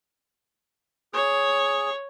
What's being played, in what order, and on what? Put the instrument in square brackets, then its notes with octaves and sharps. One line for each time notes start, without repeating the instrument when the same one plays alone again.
[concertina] G#4 [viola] C#5